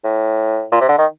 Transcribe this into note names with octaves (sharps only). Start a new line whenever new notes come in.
A2
A#2
C3
D3
D#3